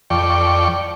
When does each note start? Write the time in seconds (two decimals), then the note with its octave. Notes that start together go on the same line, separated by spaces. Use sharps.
0.10 F2 D5 G5 C#6